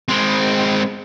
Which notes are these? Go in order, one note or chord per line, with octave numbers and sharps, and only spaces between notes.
G#3 C4